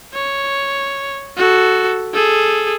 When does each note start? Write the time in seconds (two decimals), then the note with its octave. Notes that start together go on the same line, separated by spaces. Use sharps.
0.14 C#5
1.37 F#4 A4
2.14 G#4 A4